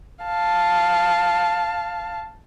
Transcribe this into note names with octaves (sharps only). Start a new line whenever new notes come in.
F5 A5